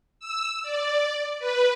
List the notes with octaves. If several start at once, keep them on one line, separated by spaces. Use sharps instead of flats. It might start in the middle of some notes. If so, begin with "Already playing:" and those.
E6
D5
B4